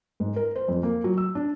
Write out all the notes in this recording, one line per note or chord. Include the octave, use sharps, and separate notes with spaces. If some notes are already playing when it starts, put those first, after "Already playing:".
G#2
A#4
C5
F2
A#3
F#3
E6
D4